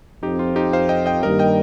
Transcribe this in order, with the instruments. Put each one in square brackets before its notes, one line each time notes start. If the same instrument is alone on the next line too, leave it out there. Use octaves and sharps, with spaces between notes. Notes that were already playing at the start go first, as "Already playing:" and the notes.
[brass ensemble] F2 F3 C4 [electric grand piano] D#4 G4
[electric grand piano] F4
D#4 G4
C5 F5
D#5 G5
D#5 G5
[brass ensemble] G2 D#3 G3 A#3 [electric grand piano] A#4 D#5
[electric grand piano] D#5 G5